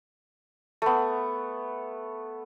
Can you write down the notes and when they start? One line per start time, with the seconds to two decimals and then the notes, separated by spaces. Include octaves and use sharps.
0.82 A3 B3